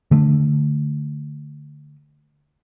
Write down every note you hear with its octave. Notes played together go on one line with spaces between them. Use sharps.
D3 A3